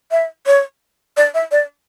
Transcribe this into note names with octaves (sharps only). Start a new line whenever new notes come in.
E5
C#5
D5
E5
D5